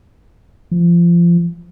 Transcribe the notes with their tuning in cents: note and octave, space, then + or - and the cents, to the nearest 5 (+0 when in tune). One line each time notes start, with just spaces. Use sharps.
F3 -25